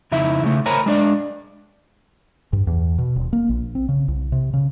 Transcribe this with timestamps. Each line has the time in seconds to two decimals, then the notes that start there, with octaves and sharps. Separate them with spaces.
0.12 F2 C#3 D#4 E4 E5
0.43 C#3 A3
0.66 A#4 C5 C#5 G#5 A#5 B5
0.86 G#3 D4 D5
2.53 G2
2.67 E2
2.98 B2
3.16 D#1
3.33 A#3
3.49 A#1
3.75 C4
3.89 C#3
4.08 C2
4.32 C3
4.53 C#3